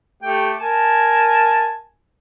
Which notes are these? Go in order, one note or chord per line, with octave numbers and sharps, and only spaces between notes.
A3 G4 G5
A#4 G#5 A5